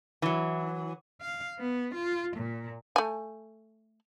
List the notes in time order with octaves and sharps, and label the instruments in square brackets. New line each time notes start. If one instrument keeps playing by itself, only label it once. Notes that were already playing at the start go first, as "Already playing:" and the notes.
[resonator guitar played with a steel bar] E3 F#3
[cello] F5
B3
F4
A#2
[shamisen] A3 G#5